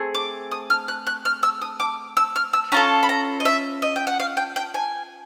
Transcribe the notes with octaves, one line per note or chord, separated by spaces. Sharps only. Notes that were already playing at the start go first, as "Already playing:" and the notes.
Already playing: A3 C4 G#4
D6
D#6
F6
F#6
F#6
F6
E6
D#6
D6
E6
F6
E6
C#4 F4 A4 A#5
B5
A#5
D#5
E5
D#5
G5
F#5
F5
G5
G5
G#5